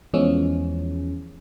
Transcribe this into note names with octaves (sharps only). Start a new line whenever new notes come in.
E2 E3 F3 G#3 C#4